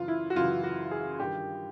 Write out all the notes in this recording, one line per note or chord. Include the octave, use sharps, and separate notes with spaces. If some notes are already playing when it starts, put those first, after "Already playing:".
Already playing: F#2 C#3 E3 F4
E4
F#4
F#2 C#3 E3 F4
F#4
G#4
G2 D#3 G4